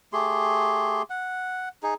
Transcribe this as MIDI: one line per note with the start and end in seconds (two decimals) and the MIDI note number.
0.13 1.02 57
0.13 1.02 67
0.13 1.02 68
0.13 1.02 84
1.10 1.69 78
1.83 1.94 63
1.83 1.94 68